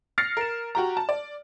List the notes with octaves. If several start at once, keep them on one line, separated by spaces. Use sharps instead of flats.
F6 A6 A#6 C7 C#7
A#4 E7
F#4 G4 A#5
A5
D5